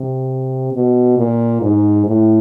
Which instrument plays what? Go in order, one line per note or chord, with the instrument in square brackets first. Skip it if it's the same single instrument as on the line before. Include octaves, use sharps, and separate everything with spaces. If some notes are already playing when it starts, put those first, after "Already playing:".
Already playing: [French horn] C3
B2
A#2
G#2
A2